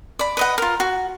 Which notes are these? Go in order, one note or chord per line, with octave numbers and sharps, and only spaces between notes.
D5 B5
B4 D#5 F#5
F4 A#4
F#4